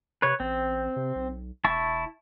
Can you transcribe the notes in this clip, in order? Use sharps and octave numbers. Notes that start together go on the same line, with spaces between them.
C3 B4 C#5
A1 C4
C3
B1
E1 E4 A5 C#6